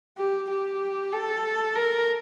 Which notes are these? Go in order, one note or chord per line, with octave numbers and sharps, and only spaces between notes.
G4
G4
A4
A#4